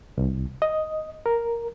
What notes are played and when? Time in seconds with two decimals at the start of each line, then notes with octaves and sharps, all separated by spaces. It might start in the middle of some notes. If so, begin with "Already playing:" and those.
0.18 C2
0.62 D#5
1.26 A#4